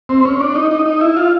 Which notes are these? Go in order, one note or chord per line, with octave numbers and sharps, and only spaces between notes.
C4
C#4
D4
D#4
D#4
D#4
E4
F4